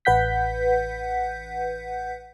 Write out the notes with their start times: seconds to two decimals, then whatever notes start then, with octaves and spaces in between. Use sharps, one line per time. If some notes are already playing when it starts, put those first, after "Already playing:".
0.05 A1 B4 F#5 G6 B6